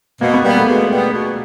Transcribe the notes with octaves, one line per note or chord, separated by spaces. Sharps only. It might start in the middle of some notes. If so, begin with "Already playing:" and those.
B2 A#3
B3
G3 A#3 B3
A3
B2 G#3
G3 B3
B2